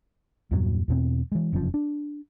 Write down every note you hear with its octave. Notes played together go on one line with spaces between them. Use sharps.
E2 G2 A#2 F#3
E2 B2 C4
E3 G#3
F1 F#2 C#3 F3
D4